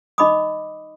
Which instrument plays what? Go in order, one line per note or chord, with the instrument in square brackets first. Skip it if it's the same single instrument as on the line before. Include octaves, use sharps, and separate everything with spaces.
[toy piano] D#4 D#5 B5 D6 D#6